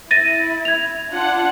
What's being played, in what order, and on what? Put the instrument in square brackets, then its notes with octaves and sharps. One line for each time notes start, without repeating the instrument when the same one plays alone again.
[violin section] E4 [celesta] A6 A#6 D#7
[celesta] G#6 F7
[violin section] D4 F4 F#5